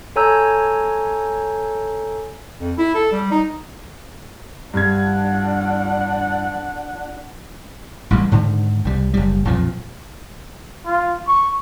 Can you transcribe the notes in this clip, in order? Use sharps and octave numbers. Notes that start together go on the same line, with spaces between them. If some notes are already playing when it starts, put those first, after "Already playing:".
A4 C#5 G#5 A#5 E6 G6
F2
E4
A4
G3
D#4
G2 D4 F#5 G#6
A1 G2 G3
G#2 D3 D#3
C2 G3
F#1 G3
B1 F2 A#2 F3
F4
C#6